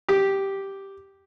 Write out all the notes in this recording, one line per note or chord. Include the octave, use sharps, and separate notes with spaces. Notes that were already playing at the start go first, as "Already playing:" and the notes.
G4